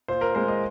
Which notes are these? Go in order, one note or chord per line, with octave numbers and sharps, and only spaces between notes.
A#2 C5
A#4
G#3 C5
D#5